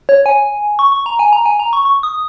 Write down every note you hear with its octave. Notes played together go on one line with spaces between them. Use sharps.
C#5
G#5
C#6
C#6
A#5
G#5
A#5
G#5
A#5
C#6
C#6
D#6